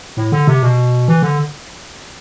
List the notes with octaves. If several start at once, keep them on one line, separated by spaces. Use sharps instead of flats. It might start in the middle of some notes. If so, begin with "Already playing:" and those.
A2
D3
C3
B2
E3
D3